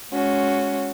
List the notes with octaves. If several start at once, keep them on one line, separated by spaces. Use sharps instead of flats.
G#3 C#4 F#4